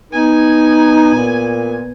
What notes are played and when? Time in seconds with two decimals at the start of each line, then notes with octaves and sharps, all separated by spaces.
0.12 B3 D#4 G#5
1.15 A#2